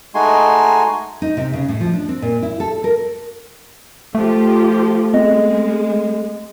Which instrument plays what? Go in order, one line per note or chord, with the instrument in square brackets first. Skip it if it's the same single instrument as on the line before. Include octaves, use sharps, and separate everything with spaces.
[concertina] G#3 A3 D#4 F#4 G#5 C6
[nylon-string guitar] D#4
C3
C#3
A2
F3
D4
C4
A#2
E4
A4
A#4
[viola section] F3 F4 G4 [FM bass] A3
[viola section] G#3 [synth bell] B3 C4 D#5